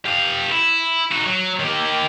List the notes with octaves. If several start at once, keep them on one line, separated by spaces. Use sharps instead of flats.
G4 F5
E4
D#4 F#4
F#3
D#3 G4